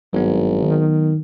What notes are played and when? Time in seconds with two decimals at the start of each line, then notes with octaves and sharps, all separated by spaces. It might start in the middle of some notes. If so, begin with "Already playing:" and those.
0.13 G#1 G2 F#3 B3
0.62 D#3